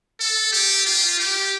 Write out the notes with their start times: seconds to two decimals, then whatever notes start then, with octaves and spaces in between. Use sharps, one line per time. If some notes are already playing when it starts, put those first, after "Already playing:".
0.20 A4
0.53 G4
0.86 F4
1.20 G4